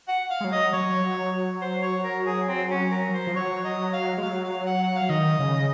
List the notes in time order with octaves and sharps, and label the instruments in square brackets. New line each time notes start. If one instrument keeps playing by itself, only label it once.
[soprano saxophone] F#5
F5
[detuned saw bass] G#3
F#3
[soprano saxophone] D#5
[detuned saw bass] F#3 [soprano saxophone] C#5
[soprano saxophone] C5
C#5
A#4
G#4
C4
C#4
A#4
C5
[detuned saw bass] F3
[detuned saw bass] F#3 [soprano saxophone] C#5
[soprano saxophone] D#5
F5
[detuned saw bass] G#3
[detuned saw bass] F#3 [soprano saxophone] F5
[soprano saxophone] F5
F#5
F#5
F5
[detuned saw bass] D#3 [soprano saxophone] D#5
[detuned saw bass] C#3